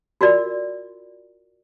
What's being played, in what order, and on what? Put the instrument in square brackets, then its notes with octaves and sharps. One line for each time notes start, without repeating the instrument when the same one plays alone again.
[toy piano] F4 F#4 A#4 D5